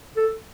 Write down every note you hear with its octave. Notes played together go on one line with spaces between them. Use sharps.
A4